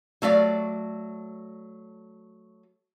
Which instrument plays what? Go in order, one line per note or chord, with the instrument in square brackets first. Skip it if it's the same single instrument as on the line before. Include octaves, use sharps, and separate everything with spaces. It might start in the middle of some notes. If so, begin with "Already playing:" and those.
[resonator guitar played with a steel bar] F#3 A3 D5 F5